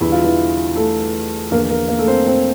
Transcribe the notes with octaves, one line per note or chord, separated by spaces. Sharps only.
E2 D3 G3 E4
F4
E3 E4
A3 A4
E2 D3 F3 A#3 A#4
A#3 A#4
A#3 A#4
A3 A4
C4 C5
C4 C5